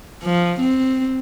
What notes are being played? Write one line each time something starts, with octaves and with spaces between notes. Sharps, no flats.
F3
C4